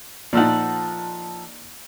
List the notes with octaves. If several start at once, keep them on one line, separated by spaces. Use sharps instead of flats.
A#2 F3 D#4 A4 F#5